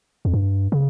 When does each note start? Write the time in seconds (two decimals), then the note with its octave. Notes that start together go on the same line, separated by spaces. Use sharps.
0.25 F2
0.33 G2
0.72 C#3